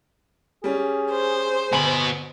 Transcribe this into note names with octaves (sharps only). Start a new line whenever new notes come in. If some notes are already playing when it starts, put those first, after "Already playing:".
G3 C#4 G#4
C5
G1 B2 G#5 B5